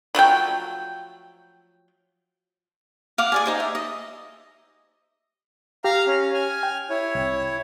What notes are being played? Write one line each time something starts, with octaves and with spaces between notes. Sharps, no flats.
F3 F#3 A3 G5
F5 F#5 D6
G#4 D5 G#5
D#4 C5 D6
E5
D#5
G4 F5 A#5 F6
C#4
G#5 F6
G5
E4 C#5
C2